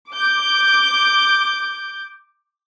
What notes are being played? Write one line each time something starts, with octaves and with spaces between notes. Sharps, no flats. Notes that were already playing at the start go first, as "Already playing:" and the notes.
D6 G6